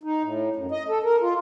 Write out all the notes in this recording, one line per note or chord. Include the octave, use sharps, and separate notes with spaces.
D#4
A2
F#2
D#5
A4
A#4
F4